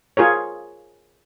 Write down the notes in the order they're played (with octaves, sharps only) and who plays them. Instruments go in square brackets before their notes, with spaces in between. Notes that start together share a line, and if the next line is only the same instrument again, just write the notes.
[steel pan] F4 G#4 A#4 C#5